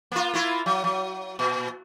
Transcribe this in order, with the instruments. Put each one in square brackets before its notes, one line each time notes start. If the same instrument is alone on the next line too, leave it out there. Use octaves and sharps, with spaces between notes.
[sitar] A#3 F4
A#3 E4 F4
F#3
F#3
A#2